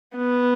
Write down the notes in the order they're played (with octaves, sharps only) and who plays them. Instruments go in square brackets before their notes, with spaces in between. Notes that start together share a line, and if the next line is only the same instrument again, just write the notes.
[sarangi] B3